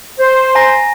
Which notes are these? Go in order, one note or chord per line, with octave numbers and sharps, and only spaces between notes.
C5
G#5 A#5 A#6